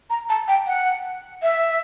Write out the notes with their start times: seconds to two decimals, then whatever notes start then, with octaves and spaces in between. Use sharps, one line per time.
0.10 A#5
0.30 A5
0.48 G5
0.67 F#5
1.42 E5